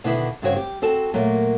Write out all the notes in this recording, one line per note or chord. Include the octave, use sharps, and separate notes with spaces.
B2 D3 D#3 D4 E4 B4
G2 C#3 C4 F#4 A#4 C#5
G4
C4 F#4 A4 A5
A#2 F#3 A3 A#3